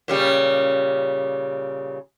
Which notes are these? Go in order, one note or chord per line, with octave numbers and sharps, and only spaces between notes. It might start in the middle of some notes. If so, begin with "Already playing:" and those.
A#2 C#3 G3